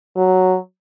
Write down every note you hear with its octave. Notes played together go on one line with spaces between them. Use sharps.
F#3